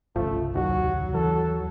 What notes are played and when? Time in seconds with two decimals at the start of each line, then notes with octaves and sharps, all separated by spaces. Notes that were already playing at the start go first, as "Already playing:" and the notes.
0.16 G1 C2 C#3 F3 A3
0.55 D#2 F#3 F#4
1.15 E3 A4